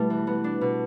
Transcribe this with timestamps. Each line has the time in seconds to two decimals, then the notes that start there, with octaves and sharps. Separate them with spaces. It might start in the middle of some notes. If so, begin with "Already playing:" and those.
Already playing: B2 G3 A3 E4 A4
0.10 E3
0.27 B3
0.44 D4
0.61 B2